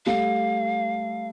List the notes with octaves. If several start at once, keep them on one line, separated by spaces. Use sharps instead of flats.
G3 A3 F5